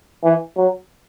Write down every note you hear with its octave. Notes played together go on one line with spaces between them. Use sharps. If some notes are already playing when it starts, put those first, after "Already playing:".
E3
F#3